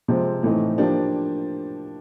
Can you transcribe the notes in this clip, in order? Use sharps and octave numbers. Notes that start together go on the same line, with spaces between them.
C3 F3 G#3 C4
A2 E3 A3 C4 D#4
F3 A#3 D4 G4